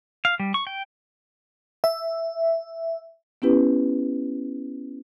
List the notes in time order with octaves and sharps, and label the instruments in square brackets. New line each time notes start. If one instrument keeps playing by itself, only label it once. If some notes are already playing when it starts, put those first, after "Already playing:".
[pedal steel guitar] F5
G3
C#6
G5
[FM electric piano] E5
[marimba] B3 C#4 E4 G4 B4